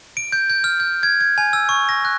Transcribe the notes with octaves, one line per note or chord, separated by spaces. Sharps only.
D7
G6
G6
F6
G6
G#6
G#6
G#5
E6
C#6
A#6
F#6